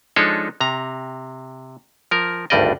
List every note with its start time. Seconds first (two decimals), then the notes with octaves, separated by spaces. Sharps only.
0.16 F3 G#3 D4 D#4 A4 C#5
0.61 C3 A#5
2.11 F3 A#4
2.50 G#1 D2 G2 G3 D5 D#5